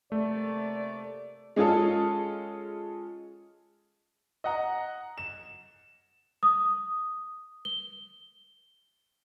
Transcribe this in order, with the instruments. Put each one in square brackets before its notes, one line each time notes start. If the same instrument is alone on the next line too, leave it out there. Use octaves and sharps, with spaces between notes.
[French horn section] C3 A#3 D5 [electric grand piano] A3
[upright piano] G#3 C#4 F4 G#4 A4
D#5 F#5 A#5
E7
[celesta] D#6
G7